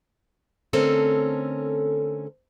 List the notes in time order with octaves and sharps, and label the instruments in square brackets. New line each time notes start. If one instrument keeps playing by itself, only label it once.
[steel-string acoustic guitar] D3 A3 C4 C#4 A4 A#4